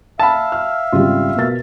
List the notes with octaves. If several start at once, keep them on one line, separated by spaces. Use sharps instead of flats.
E5 F5 A5 B5
F6
G#1 C#3 G3 F4
B2 A#4 A6